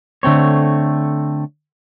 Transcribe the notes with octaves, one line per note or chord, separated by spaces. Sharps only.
D3 A3 C4 C#5